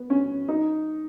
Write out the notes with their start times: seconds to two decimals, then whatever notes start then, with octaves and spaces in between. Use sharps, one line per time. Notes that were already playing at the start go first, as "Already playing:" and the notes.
Already playing: B3
0.10 C#4
0.49 D#4